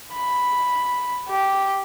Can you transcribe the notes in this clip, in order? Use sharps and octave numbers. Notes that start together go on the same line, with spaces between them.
B5
G4